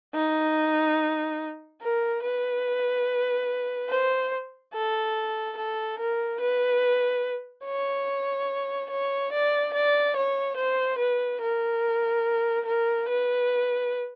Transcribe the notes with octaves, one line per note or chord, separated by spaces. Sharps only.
D#4
A#4
B4
C5
A4
A4
A#4
B4
C#5
C#5
D5
D5
C#5
C5
B4
A#4
A#4
B4